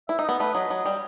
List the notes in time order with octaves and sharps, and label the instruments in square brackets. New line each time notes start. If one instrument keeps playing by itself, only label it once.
[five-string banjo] E4 [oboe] E5
[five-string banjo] D#4
[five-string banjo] B3 [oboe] D#5
[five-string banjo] A3 [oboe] B4
[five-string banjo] F#3 [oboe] D#5
[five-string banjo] F#3
G3